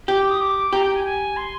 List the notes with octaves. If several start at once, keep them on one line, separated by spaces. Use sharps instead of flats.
G4
D6
D#6
D6
G4 A#5
G5
G#5
G#5
C6